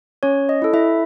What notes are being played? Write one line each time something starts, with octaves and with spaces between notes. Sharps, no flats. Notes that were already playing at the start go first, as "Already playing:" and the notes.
C#4 C#5
D#5
E4 A4
E4 E5